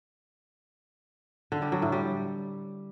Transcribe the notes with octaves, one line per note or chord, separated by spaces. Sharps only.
D3
G3
F#3
A2
G3